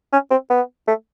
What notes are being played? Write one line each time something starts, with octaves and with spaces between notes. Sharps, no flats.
C#4
C4
B3
A3